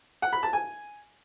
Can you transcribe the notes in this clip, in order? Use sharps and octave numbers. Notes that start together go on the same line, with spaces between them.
F#5
B5
A5
G#5